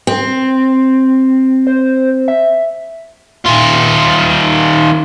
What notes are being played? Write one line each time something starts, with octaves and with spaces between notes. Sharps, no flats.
C4
C5
E5
D#3 F4